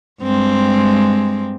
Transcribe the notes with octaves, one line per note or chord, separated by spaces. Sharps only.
G2 G#3 C4